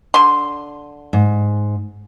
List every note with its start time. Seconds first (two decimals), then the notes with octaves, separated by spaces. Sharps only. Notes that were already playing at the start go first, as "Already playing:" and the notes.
0.14 D3 C6
1.13 G#2